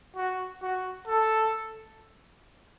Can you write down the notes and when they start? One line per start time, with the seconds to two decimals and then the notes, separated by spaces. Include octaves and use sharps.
0.16 F#4
0.62 F#4
1.08 A4